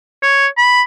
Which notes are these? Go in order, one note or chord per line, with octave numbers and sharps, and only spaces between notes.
C#5
B5